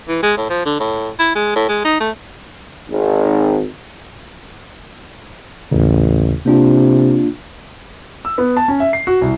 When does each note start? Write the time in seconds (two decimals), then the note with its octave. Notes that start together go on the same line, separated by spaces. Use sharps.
0.09 E3
0.23 G#3
0.37 A2
0.50 F3
0.66 D3
0.80 A2
1.19 E4
1.35 G#3
1.56 A2
1.69 G#3
1.85 D#4
2.00 A3
2.88 G#1
5.71 A1 D#2 C#3
6.46 C3 A#3 D4 F4
8.25 E6
8.38 B3
8.57 A5
8.68 C#4
8.80 E5
8.93 C7
9.07 F#4
9.22 C2